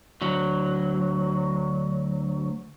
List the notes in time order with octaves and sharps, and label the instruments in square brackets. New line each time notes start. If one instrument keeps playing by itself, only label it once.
[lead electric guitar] D2 F#3